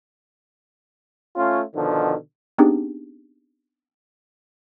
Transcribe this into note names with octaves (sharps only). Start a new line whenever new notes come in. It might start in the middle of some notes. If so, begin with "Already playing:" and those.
A3 C#4 F4
B2 D3 D#3 F3
B3 C4 D4 D#4 G4 G#4